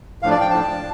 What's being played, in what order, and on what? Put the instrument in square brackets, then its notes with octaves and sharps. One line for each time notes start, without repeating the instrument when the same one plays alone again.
[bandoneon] A2 F3 D4 F5
D5
G5
A2 F3 D4 A5